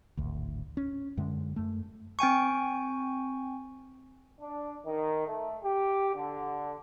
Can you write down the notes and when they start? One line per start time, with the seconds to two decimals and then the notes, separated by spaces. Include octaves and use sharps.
0.17 D1 G#1 D2
0.77 C#4
1.17 F#2 D3 G#3
1.56 F#2 A3
2.19 C4 G5 G#5 C#6
4.40 D4
4.85 D#3
5.26 A3
5.64 G4
6.14 D3